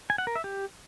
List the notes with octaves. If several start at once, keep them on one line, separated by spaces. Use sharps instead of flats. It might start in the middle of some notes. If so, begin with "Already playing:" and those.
G#5
F#5
A#4
E5
G4